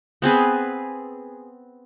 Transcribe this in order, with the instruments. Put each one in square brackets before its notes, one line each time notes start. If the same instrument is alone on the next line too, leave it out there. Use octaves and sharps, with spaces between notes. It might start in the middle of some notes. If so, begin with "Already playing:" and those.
[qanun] B3 C4 G#4 B4